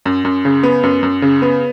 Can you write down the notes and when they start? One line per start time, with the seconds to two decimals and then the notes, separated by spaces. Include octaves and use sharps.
0.06 F#2
0.25 F#2
0.45 C#3
0.63 B3
0.83 F#2
1.03 F#2
1.22 C#3
1.42 B3